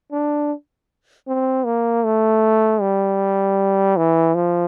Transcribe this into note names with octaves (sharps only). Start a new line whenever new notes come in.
D4
C4
A#3
A3
G3
E3
F3